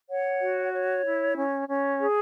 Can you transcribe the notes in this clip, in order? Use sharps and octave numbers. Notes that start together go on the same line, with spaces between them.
C#5 F#5
F#4
C#5
E4
C#4
C#4
G#4